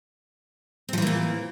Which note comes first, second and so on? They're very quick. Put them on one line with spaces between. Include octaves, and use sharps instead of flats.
C4 F3 E3 A#3 A#2